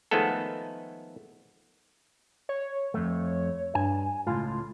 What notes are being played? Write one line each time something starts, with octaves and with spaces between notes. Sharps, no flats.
D#3 F3 G#3 A3 B3 A4
C#5
F2 A3
G2 G#5
C#2 F#2 A2 F4